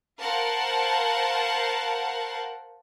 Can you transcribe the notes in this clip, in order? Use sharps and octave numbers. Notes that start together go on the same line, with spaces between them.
A#4 C5 F5 F#5 A5